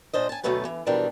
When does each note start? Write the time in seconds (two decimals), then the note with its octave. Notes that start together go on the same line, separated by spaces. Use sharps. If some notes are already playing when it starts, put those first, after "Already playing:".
0.13 A#2 D4 C5 D#5
0.29 G#5 A5
0.43 D2 B2 F#3 A3 B4 A5
0.65 E3
0.86 B2 E3 F3 G3 D4 A#4